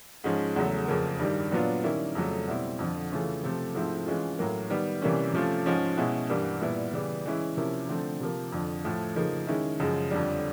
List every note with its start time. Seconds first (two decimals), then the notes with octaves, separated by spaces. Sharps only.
0.24 G#2 F3 G#3 C#4
0.56 E2 C#3 F#3 A3
0.88 F2 C#3 F3 A#3
1.19 G2 D#3 G3
1.52 A#2 F#3 B3 D4 F4
1.84 D#3 G3 A#3 C#4 E4
2.15 F2 C#3 F#3 A3
2.47 B2 G3 C4 E4
2.79 F2 D3 F3
3.12 C#3 E3 A3 C#4 F4
3.43 C3 F3 A3 C4
3.75 G#2 F3 A3 C4 E4
4.06 E3 G#3 C#4 F4
4.39 A2 F#3 A#3
4.70 D#3 G3 B3
5.02 C3 E3 G3 A#3 C#4
5.33 C3 F3 A3 C#4 F4
5.66 G#2 F3 G#3 C#4
5.97 B2 G#3 C#4 E4
6.30 G2 E3 G3 A#3
6.61 A#2 G3 B3 E4
6.93 C#3 E3 G3 B3
7.26 E3 G#3 C#4 E4
7.57 C3 F3 A#3 C#4 E4
7.89 D3 F3 A3 C4
8.20 C3 F3 A#3
8.52 F2 D3 F3
8.84 A2 F3 A3
9.16 C#3 F3 A#3 D#4
9.47 D#3 G#3 C#4 E4
9.80 F#2 C#3 F3 G#3
10.11 F2 D3 G3